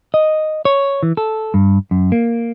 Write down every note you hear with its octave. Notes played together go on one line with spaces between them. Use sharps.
D#5
C#5
E3
A4
G2
F#2
A#3